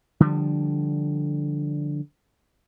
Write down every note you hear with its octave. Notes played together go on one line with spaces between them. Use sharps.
D3 F3 G3